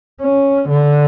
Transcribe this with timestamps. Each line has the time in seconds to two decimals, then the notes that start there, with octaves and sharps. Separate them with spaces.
0.21 C#4
0.70 D3